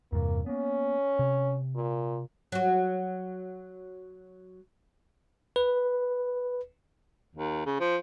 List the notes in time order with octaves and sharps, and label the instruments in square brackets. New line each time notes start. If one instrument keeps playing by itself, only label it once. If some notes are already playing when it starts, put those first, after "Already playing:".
[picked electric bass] E2 G2 C3 [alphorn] A#3
[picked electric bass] A#3 B3 [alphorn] C#4
[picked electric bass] C3
[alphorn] A#2
[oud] F#3 F#4
[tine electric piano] B4
[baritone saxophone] D#2
C#3
F3